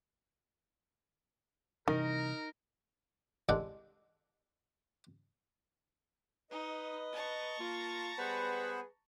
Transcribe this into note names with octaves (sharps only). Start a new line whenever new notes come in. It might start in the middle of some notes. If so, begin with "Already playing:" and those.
C3 D#3 E3 G3 D#4 A#4
C2 G#3 D4 A4 F#5
D#4 B4 D#5
A5 A#5 C#6
A#3 F4
G3 B3 G#4 B4 C5 F#5